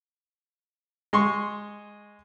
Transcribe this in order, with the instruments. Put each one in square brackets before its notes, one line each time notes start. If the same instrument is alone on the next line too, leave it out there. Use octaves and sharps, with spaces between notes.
[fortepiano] G#3 C6 C#6